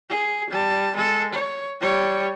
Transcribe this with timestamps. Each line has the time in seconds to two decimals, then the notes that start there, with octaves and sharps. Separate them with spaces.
0.10 G#4
0.50 G3 A5
0.96 G#3 A4
1.33 C#5
1.81 G3 C#5